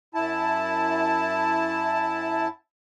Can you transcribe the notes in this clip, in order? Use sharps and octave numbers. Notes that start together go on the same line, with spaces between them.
F#2 E4 A5